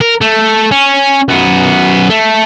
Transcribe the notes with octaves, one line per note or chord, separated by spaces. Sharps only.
A#4
A3
C#4
F#2 B3
A3